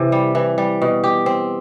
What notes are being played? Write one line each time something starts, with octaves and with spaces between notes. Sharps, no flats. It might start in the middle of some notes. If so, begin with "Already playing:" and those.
Already playing: C3 E3
G3
E3
G3
B2
G4
C4